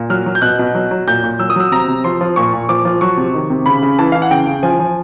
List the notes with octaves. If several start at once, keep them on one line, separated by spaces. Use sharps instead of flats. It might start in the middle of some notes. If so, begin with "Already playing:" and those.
Already playing: A#2
F#3 F6
F#3
G6
B2 F#6
B2
F#3
F#3
A#2 G6
A#2
F#3 E6
D#6
F#3 E6
C3 A#5
C3
F3 C6
F3
A#2 C#6
A#2
F3 D6
F3
F#3 C#6
C3
D#3
C3
C#3 B5
C#3
E3 A5
E3 F5
F#5
C#3 G5
C#3
F3 G#5
F3